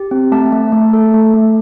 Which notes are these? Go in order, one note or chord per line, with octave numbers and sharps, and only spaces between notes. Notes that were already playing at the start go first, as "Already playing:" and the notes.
Already playing: G4
C4
A3 A5
A3
A3
A4
A3
A3